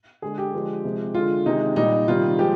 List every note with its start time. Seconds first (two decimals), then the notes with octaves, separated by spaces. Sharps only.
0.22 D3 G#3 G#4
0.38 G4
0.53 D3 F3 G#3
0.84 C3 F3 G#3
1.14 D3 G#3 F4
1.46 C3 D#3 G#3 D#4
1.76 A#2 G3 D#4
2.08 C3 D#3 G3 F4
2.38 F3 G#3 G4